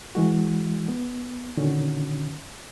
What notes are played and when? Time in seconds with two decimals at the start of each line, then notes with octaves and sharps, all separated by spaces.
0.15 E3 G#3 F#4
0.88 B3
1.57 A#2 D3 D#3 C#4 F#4